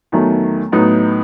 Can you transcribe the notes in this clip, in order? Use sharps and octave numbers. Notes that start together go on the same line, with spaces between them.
E2 D#3 F#3 A3
A2 F#3 B3 D#4